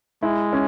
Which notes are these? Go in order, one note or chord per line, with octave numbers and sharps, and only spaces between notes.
G#3 E4
C#4